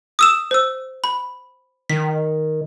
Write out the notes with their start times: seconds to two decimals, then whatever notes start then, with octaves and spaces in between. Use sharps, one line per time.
0.19 D#6 E6 E7
0.51 C5 E6
1.04 B5
1.90 D#3 B6